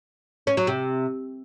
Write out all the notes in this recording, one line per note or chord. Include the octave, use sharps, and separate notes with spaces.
C#4
F#3
C3